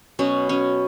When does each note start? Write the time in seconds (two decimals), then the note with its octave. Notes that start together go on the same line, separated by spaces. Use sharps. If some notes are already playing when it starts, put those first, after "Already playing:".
0.19 B2 F#3 B3 C#4
0.49 C#4